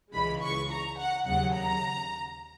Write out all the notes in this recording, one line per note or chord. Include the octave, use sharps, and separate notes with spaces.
C#2 C#3 E3 G#3 B5
C#6
A#5
F#5
D#2 C#3 F#3 F#5
A#5